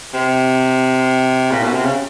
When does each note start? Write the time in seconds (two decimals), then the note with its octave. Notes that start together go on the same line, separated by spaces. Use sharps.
0.13 C3
1.51 A#2
1.63 B2
1.73 C3
1.84 C#3